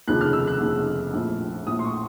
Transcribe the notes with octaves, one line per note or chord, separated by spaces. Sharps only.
F1 D#2 C#3 F3 F#6
F6
E6
F#6
F1 D#2 C#3 F3
A#1 A2 F3
A#1 A2 F3 D#6
C6
C#6